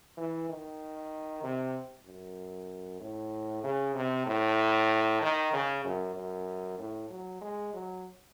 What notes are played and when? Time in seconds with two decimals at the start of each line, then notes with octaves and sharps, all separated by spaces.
0.17 E3
0.49 D#3
1.43 C3
2.06 F#2
3.01 A2
3.63 C#3
3.95 C3
4.26 A2
5.21 D#3
5.53 C#3
5.84 F#2
6.15 F#2
6.79 A2
7.10 F#3
7.41 G#3
7.73 F#3